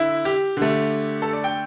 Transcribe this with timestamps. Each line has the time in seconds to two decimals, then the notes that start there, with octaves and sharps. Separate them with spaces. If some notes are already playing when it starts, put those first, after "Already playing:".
Already playing: D3 E4
0.25 G4
0.57 D3 A3
1.22 A4
1.33 D5
1.44 G5